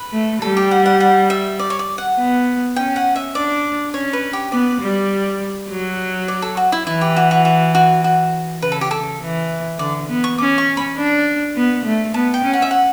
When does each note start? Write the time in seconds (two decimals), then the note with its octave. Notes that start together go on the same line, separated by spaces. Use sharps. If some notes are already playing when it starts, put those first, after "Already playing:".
Already playing: B4
0.13 A3
0.42 G3 A4
0.57 G4
0.71 F#5
0.86 F#5
1.00 F#5
1.30 E5
1.59 D5
1.70 C#5
1.79 D5
1.98 F#5
2.18 B3
2.76 C#4 G5
2.96 F#5
3.16 E5
3.35 D4 D5
3.94 C#4 C#5
4.13 B4
4.33 G4
4.52 B3 D5
4.81 G3
5.70 F#3
6.28 D5
6.42 A4
6.57 F#4
6.72 E4
6.86 E3 E4
7.01 G4
7.16 F#4
7.31 F#4
7.45 F#4
7.75 F#4
8.04 F#4
8.62 C#3 B4
8.72 A4
8.81 G4
8.91 A4
9.21 E3
9.79 D3 D5
10.09 B3
10.24 C#6
10.38 C#4 D6
10.58 C#6
10.77 B5
10.97 D4
11.56 B3
11.85 A3
12.14 B3 A5
12.34 G5
12.44 C#4
12.53 F#5
12.62 E5
12.71 F#5